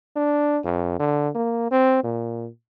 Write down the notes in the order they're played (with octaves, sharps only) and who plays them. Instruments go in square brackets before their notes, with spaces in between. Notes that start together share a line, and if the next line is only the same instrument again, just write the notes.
[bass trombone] D4
F2
D3
A#3
C4
A#2